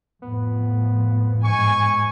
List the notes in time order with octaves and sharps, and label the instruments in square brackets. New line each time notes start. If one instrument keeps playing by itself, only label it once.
[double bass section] F2 A2 F3 [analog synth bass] B3
[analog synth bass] G#2 [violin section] G#5 [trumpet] C#6